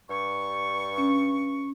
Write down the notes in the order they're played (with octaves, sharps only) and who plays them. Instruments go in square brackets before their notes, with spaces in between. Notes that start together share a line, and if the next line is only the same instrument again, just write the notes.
[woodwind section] G2 C#6
[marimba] C#4